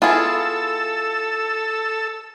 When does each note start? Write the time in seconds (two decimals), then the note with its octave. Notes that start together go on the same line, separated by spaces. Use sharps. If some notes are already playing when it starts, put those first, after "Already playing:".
0.02 B3 E4 F4 G#4 A4 E6